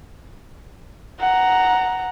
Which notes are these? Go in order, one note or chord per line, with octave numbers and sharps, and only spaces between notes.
F#5 A#5